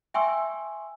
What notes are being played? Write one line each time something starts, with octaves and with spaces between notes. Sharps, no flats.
E5 G5 G#5 C6 C#6 E6